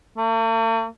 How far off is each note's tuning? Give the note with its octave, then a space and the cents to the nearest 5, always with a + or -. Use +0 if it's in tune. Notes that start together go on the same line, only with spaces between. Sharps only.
A3 +45